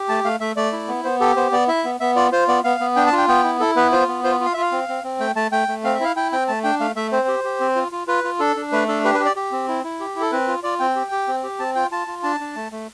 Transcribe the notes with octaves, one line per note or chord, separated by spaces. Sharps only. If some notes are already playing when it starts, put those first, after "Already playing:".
Already playing: G4
A3 A5
A3 F5
A3 E5
A3 D5
E4
B3
B3 C5
G4 A4
B3 C5
B3 D5
E4 E5
B3
B3 E5
F4 D5
F4 C5
B3 D5
B3 F5
B3
D4 G5
A5
F4
G5
B3 G5
E4
E4 A4
B3 B4
F4 C5
B3
F4 C5
F4
F5
F4 E5
F5
C4
C4
C4
A3 G5
A3 A5
A3 G5
A3
C4 F5
E5
E4 F5
E4 G5
C4 G5
A3 A5
D4 G5
A3 F5
A3 E5
C4 C5
G4
G4
C4
F4
F4
F4 B4
F4
D4 A4
D4
A3 B4
D4 A4
G4 B4
B4
G4
D5
G4
C4
E4
E4
G4
E4
A4
C4 B4
F4
F4 D5
C4 G5
G4
G4
C4
G4
C4 A5
F4 G5
F4 A5
F4
D4 A5
D4
A3
A3